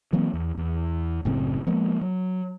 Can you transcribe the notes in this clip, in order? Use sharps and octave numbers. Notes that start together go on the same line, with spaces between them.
E3 F#3 A#3 C4
E2
E2
F#1 A2 C#3 C4
F3 G#3 A#3 B3
F#3